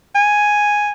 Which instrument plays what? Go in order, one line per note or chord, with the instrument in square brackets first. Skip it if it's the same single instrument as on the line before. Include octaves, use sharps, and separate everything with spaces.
[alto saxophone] G#5